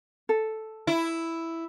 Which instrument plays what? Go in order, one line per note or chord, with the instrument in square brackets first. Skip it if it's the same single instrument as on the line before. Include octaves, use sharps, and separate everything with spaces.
[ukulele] A4
[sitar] E4